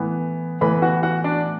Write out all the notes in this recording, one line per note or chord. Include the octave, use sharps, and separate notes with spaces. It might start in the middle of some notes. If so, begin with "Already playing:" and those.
Already playing: A2 E3 B3
A2 E3 B3 B4 B5
F#4 F#5
F#4 F#5
D4 D5